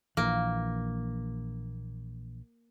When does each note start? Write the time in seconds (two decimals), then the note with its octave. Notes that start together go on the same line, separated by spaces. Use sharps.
0.17 A#1 E3 A#3